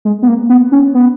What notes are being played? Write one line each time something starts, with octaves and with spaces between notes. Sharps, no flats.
G#3
B3
A#3
B3
C#4
B3